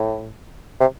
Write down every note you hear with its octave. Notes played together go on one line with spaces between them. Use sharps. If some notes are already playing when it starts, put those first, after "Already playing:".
Already playing: A2
C3